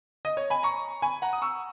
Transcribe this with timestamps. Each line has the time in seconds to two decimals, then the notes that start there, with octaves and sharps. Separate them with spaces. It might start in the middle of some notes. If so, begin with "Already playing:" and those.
0.25 D#5
0.37 C#5
0.50 G#5 B5
0.63 A#5 C#6
1.02 G#5 B5
1.22 F#5 A#5
1.33 D#6
1.42 C#6 E6